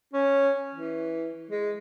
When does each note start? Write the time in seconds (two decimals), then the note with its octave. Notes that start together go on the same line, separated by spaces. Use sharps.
0.13 C#4
0.75 E3
1.51 G#3